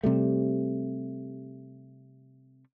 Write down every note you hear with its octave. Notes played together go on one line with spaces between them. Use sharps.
C3 G3 A3